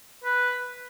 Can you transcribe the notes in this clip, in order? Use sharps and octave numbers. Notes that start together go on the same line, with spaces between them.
B4